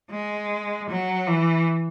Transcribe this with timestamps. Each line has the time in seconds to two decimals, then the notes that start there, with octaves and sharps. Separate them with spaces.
0.11 G#3
0.90 F#3
1.28 E3